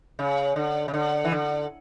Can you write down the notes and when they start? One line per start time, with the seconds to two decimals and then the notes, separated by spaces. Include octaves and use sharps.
0.19 C#3
0.56 D3
0.88 C#3
0.94 D3
1.24 E3
1.32 D3